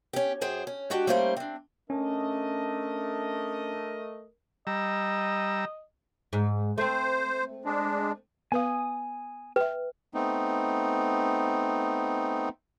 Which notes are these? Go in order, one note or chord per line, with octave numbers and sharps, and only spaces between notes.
C#4 G4
F#2 G#4 C5 G5
C#4
G#3 D4 F#4 G4 G5
G3 A3 A#3 C#4 D#4 C5
C4 D4
A3 C#4 D4 A#4 D#5
G3 D#5 A#5 E6
G#2
A3 C4 C5
G#3 D4
B3 B4 F5 G#5 D#6
B4 E5 G5
A3 B3 C4 D#4